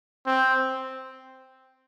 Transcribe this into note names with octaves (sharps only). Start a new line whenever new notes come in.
C4